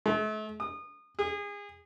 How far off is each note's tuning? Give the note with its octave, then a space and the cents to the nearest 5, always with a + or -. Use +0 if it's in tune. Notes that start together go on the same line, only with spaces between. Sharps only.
A3 -40
D#6 -30
G#4 -30